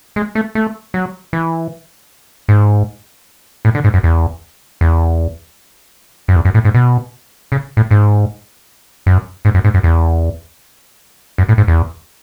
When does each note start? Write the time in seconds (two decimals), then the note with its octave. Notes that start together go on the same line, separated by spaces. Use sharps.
0.16 G#3
0.35 A3
0.55 A3
0.94 F#3
1.33 E3
2.48 G#2
3.65 A2
3.75 D3
3.84 G#2
3.94 F#2
4.03 E2
4.81 E2
6.28 F#2
6.36 E2
6.45 F#2
6.54 A2
6.65 G#2
6.74 B2
7.52 C#3
7.77 A2
7.91 G#2
9.06 F#2
9.45 G#2
9.54 F#2
9.64 G#2
9.74 F#2
9.83 E2
11.38 F#2
11.49 A2
11.58 G#2
11.68 E2